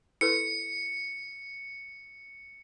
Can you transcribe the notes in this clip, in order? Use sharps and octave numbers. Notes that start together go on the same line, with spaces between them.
E4 A4 B4 C#7